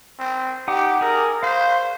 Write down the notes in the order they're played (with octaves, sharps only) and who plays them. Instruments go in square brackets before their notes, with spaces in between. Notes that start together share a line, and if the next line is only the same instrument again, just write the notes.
[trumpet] C4
[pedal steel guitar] D#4 F#5 D6 [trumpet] G4
[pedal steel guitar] G#4 [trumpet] A#4
[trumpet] C5 [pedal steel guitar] F5